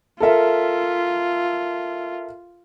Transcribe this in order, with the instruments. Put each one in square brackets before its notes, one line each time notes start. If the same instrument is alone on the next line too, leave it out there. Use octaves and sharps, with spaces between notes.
[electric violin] F4 [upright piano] A4 A#4 E5